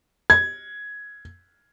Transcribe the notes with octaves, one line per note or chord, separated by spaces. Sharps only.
G#6